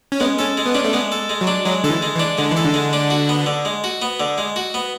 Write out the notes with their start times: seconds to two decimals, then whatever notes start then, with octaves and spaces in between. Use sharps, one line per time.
0.12 C#4
0.20 G#3 B3
0.39 C#4 A4
0.57 G#3
0.66 B3
0.74 C#4 D4
0.84 A3
0.93 G#3 B3
1.12 A4
1.29 G#3
1.41 F#3
1.47 D4
1.66 F#3 G#3
1.84 D3 A4
1.89 E3
2.02 G#3
2.15 E3
2.19 D4
2.38 D3 G#3
2.51 E3
2.57 A4
2.65 D3
2.74 G#3
2.93 D4
3.10 F#4
3.29 B3
3.46 D3
3.65 G#3
3.84 F#4
4.02 B3
4.20 D3
4.38 G#3
4.56 F#4
4.74 B3